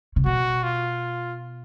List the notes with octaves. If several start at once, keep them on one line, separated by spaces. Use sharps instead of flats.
C#3
B2 F#4
F4